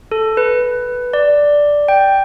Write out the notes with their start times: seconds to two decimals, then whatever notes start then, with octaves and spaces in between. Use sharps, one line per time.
0.12 A4
0.37 B4
1.13 D5
1.88 G5